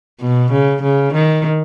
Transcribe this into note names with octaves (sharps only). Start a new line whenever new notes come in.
B2
C#3
C#3
D#3